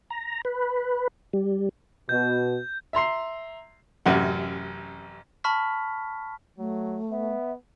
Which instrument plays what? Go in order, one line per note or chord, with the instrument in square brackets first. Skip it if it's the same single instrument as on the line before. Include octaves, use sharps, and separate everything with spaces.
[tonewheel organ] A#5
B4
G3
[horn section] B2 [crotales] G6
[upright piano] E5 A#5 C6 C7
[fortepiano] A1 F#2 C3 F#5
[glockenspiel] A5 B5 C#6 F6 B6
[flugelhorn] F#3 [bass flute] A3
[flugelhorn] B3 [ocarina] E5